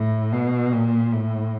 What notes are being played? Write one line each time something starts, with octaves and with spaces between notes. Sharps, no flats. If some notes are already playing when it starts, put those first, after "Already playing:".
Already playing: A2
B2
A#2
A2